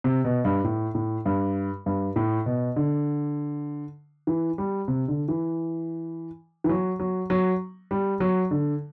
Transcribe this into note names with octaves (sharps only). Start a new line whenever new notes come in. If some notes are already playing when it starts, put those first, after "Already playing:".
C3
B2
G2
A2
A2
G2
G2
A2
B2
D3
E3
G3
C3
D3
E3
E3
F#3
F#3
F#3
G3
F#3
D3